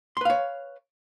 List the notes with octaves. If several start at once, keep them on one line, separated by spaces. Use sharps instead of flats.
B4 C#5 F5 C6